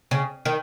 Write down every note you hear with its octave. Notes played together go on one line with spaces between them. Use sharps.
C#3
D#3